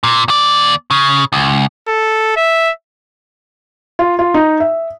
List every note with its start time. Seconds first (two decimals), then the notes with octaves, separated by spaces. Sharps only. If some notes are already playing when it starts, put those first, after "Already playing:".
0.03 A#2
0.28 D#2 D5
0.91 C#3
1.33 C#2
1.88 A4
2.37 E5
3.99 F4
4.19 F4
4.34 D#4
4.60 E5